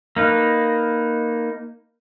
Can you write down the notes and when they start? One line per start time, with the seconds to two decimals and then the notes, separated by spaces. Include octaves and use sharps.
0.16 A#3 D#4 B4